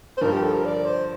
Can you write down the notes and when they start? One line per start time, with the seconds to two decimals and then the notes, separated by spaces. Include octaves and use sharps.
0.17 C5
0.21 G2 D3 F3 A#4
0.33 G4
0.44 A4
0.54 A#4
0.65 D5
0.86 C5